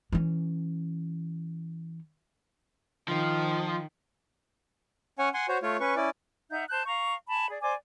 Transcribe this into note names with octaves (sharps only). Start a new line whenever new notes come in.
E3 C#4
D#3 F3
C#4 C#5 F#5 G#5
F#5 G#5 C6
F#4 C5 C#5
A3 F4 C#5
C#4 B4 C#6
C#4 E4 D5
D#4 E5 F#5 G6
C5 A5 F#6 G6
F5 A#5 C#6
G#5 A5 B5
G#4 D5
C5 D5 G#5 D6